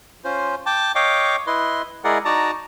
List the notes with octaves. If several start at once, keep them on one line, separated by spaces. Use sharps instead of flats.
C#4 F4 C5
G5 A5 D6
C#5 D#5 F5 G5 C#6 D6
E4 B4 D#5 C6
G#3 E4 G#4 A#4 D5 F#5
D#4 F#4 D5 A5 A#5